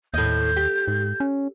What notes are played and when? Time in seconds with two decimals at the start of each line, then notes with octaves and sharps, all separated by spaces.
0.14 D#2 A2 D#5 G6
0.56 G4
0.88 G#2
1.20 C#4